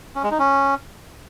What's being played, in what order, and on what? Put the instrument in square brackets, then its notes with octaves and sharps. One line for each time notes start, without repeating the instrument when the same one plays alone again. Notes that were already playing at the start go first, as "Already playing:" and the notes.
[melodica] C#4
G#3
D#4
C#4